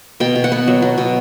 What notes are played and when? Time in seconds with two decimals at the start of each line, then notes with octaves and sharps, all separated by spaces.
0.20 B2 G5
0.35 B2
0.44 F#5
0.52 B3
0.67 F#3
0.82 F#3
0.98 B2